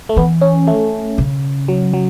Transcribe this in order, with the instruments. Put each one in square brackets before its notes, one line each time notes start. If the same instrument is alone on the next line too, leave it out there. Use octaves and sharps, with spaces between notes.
[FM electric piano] A3
[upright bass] E3 [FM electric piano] B3
[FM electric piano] C#4
A3
[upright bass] C#3
[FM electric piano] F#3
F#3